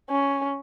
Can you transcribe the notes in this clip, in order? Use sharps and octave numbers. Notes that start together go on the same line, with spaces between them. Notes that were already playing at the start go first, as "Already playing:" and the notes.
C#4